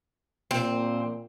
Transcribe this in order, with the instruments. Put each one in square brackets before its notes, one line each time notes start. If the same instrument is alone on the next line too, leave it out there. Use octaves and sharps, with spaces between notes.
[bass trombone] A#2 [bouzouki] C4